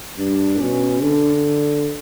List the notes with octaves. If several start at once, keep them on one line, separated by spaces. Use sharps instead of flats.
G2 D4
B2 C#4
D3 D4